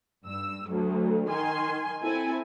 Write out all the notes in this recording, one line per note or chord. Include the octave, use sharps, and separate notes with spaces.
G2 E6
D2 F#3
D#3 G#5 C6
C4 E4 A4 G#5